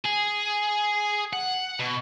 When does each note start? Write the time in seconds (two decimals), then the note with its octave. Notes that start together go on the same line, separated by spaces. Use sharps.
0.05 G#4
1.33 F#5
1.80 B2